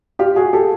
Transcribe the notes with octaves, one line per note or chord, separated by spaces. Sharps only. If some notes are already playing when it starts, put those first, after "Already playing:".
F4 G4
F#4 G#4
G4 A4